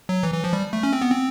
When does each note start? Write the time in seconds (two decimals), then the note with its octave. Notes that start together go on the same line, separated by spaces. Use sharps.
0.09 F#3
0.23 E3
0.34 E3
0.44 F3
0.53 G3
0.73 A3
0.83 C#4
0.93 C4
1.02 B3
1.12 C4